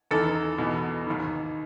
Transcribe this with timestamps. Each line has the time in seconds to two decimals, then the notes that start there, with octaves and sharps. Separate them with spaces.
0.11 E2 D#3 A4
0.58 E2 B2
1.07 D#2 D#3